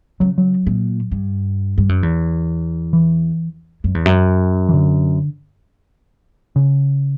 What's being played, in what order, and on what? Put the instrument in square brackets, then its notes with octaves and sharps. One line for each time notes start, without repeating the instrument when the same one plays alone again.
[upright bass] C#3 [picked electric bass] F#3
[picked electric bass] F#3
[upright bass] A#2
G2
G2
F#2
E2
[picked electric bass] E3
[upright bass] F#2
E2
F#2
[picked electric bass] E3
D3
C#3